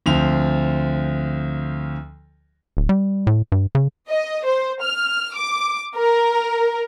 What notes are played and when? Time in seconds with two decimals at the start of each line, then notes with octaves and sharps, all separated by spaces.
0.06 D2 F3 C4 F7
2.77 D1
2.89 G3
3.27 A2
3.52 G2
3.75 C#3
4.09 D#5
4.45 C5
4.82 F6
5.36 D6
5.95 A#4